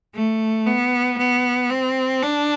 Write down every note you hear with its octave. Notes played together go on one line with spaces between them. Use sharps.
A3
B3
B3
C4
D4